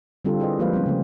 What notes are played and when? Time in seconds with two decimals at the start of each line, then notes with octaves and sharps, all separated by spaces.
0.25 D3 G3 C4 F4 A4
0.39 E4 G4 G#4 B4 D#5
0.59 F3 G#3 A#3 B4 C5 F5
0.74 G3 C4 C#4
0.86 C#3 A3